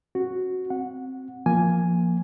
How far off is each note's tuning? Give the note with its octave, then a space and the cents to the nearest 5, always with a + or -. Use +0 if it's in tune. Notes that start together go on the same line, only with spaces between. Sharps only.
C#4 -35 F#4 +0
C4 +0 F#5 -15
F3 -5 A#3 +0 G#5 +0